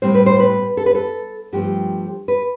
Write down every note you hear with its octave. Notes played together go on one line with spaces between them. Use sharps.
A2 G3 C4 C5
B4
C5
B4
A4
B4
A4
G2 F3 A3 C4 G4
B4